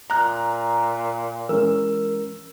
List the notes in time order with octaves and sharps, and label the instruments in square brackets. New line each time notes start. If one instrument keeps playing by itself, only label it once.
[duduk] A#2 [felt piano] A#5 F#6
[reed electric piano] E3 G#3 C#4 [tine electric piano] A#4 [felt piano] E6